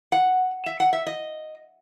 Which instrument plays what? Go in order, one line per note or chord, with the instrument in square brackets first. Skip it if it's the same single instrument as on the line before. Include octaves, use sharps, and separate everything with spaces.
[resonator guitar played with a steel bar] F#5
E5
F#5
E5
D#5